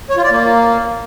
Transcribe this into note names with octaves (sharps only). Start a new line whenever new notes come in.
C#5
F4
D5
A#3